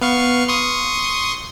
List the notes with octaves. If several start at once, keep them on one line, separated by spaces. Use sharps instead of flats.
B3 F5 C#6
C6 C#6 D#6